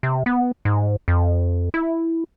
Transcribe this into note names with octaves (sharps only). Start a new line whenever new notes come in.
C3
B3
G#2
F2
E4